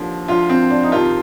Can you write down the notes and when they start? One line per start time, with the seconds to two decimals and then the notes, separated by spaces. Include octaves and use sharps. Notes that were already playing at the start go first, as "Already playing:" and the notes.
Already playing: D#2 D3 F3
0.28 D2 D3 F3 F4
0.49 C4
0.70 D4
0.83 D#4
0.92 F2 C3 D#3 F4